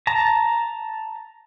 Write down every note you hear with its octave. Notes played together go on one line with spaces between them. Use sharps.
A5 A#5